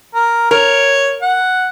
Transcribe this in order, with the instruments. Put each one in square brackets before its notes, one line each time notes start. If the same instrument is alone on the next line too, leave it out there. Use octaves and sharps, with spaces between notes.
[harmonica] A#4
[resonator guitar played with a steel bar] A#4 [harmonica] C#5
[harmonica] F#5